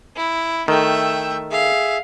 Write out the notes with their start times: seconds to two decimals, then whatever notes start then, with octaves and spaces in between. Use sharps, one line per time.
0.16 E4
0.68 D#3 A3 E5 G5 E6
1.52 G#4 E5 F5